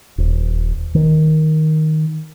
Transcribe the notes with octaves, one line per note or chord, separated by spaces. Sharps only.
D#1
D#3